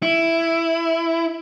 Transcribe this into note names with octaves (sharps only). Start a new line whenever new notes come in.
E4